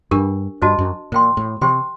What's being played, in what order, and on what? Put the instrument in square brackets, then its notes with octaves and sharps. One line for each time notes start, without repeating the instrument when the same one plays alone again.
[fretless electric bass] G2 [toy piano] D4 G4 A#4
[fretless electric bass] G2 [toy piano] F#4 C5 D#5 A5
[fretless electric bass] F#2
[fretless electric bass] A#2 [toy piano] C5 G5 C6
[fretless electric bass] A2
[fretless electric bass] C3 [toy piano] G4 C5 G5 C6